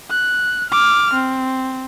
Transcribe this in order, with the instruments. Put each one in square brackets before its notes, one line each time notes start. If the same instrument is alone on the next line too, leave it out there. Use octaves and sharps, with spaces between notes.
[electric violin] F#6
D6 F6
C4